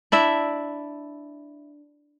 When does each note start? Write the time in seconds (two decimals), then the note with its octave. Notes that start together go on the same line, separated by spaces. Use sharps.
0.12 D4 E4 E5